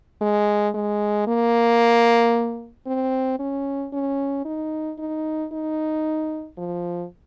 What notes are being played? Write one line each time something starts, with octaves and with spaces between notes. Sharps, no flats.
G#3
G#3
A#3
C4
C#4
C#4
D#4
D#4
D#4
F3